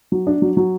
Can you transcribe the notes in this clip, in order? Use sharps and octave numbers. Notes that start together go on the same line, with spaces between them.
F#3
D4
F#3
F#3